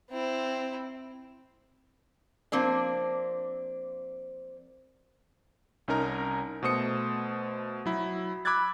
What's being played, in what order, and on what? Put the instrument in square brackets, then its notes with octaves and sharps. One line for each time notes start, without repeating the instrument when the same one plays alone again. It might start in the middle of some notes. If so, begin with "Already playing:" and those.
[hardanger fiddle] C4 E4
[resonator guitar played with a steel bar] F3 A#3 C4 D4
[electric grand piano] C2 C#4 D#4 A#4 A#5
B2 A3 C5 D#6 C#7
F#3 E4
B5 D6 E6 F#6 G#6 A6